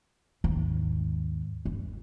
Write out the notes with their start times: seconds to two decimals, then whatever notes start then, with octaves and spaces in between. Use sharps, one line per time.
0.44 D#2 G#2
1.65 G1